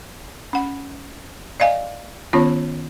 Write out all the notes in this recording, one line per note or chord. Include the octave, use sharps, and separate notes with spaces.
C#4 F#5
D5 D#5 F5 G#5
D#3 B3 C#4 F4 C#5